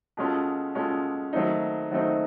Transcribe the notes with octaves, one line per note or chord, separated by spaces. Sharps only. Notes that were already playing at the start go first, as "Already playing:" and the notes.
B2 G#3 C#4 F4 A4
B2 G#3 C#4 F4 A4
D#3 F#3 A3 C4 D#4
D#3 F#3 A3 C4 D#4